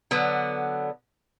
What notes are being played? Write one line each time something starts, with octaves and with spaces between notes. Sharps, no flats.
D3 F#3 B3